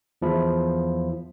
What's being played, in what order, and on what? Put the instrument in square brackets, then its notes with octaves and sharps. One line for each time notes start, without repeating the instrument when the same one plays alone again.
[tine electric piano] E2 F3 E4